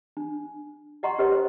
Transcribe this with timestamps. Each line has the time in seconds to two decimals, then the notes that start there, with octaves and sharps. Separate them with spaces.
0.17 D4
1.03 D5 D#5 F#5 A#5 C6 C#6
1.18 C#4 G4 A#4 B4 C#5 D#5
1.32 C5